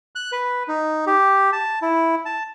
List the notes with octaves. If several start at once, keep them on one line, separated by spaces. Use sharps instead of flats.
F#6
B4
D#4
G4
A5
E4
A5